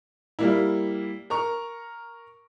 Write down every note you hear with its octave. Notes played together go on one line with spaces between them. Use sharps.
G3 A#3 E4
A#4 A#5 C#6